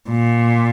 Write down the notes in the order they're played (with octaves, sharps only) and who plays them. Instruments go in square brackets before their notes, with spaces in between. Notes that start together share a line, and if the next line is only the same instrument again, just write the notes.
[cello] A#2